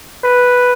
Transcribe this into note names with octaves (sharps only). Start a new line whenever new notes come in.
B4